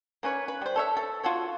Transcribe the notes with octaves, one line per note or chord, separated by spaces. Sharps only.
A#3 C#4 B4 C#5
B4
G3 C5
A4 C#5 E5
A4
F4 F#4 A4 C#5